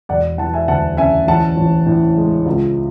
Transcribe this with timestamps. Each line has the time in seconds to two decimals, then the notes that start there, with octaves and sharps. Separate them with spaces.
0.09 E1 D5 F#5
0.38 E3 F#5 A5
0.54 E5 G#5
0.68 D2 F#5 A5
0.97 C#3 E5 G#5
1.27 A1 F#5 A5
1.57 A1
1.86 A2
2.17 G#3
2.46 C#2